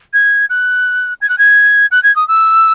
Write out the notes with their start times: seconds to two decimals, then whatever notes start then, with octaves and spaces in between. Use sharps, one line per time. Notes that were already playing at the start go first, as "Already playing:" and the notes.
0.13 G#6
0.50 F#6
1.21 G#6
1.29 F#6
1.38 G#6
1.91 F#6
2.03 G#6
2.16 D#6
2.28 E6